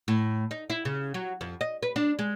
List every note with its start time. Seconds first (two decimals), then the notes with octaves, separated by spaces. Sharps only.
0.08 A2
0.51 D#4
0.70 E4
0.85 C#3
1.14 F#3
1.41 F2
1.61 D#5
1.83 B4
1.96 D4
2.19 G#3